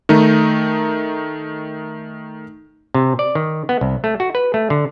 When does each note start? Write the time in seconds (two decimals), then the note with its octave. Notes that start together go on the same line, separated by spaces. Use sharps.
0.09 D#3 A3 D#4
2.95 C3
3.19 D5
3.35 D#3
3.69 B3
3.81 C2
4.04 A3
4.20 F#4
4.35 B4
4.54 A3
4.70 D3